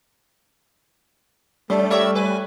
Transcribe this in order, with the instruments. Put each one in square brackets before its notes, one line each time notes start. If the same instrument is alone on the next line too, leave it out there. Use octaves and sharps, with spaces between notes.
[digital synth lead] G3 [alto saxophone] A3 [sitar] C#4 [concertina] A4
[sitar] A#4 C#5 E5 [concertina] D5 E6
[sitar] B4 [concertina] G#5